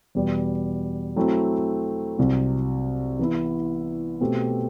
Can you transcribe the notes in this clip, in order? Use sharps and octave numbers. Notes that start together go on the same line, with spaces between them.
E2 B2 G3
F#3 A3 C4 E4
C2 C3 F#3 C4
E3 B3 E4
B2 A3 C4 G4